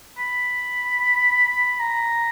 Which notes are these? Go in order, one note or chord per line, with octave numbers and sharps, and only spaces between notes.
B5
B5
A#5